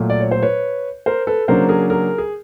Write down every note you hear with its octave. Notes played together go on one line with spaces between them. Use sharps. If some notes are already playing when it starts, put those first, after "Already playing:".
Already playing: A#2 F#3 A3
D5
C#5
C5
B4 C#5
A#4 C5
A4 B4
C#3 F#3 A#3 D4 A#4 C5
G#4 A#4
G#4 A#4
G#4